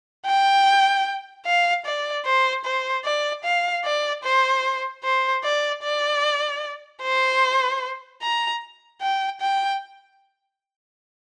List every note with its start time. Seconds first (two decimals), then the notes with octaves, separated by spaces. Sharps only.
0.26 G5
1.46 F5
1.86 D5
2.26 C5
2.65 C5
3.05 D5
3.44 F5
3.85 D5
4.24 C5
5.04 C5
5.44 D5
5.83 D5
7.02 C5
8.22 A#5
9.01 G5
9.41 G5